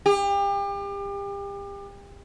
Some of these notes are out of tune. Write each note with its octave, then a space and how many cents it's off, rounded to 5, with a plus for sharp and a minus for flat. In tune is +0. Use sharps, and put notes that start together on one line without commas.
G4 +35